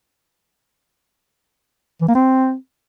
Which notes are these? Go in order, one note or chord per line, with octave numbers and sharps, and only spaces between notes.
E3
A#3
C4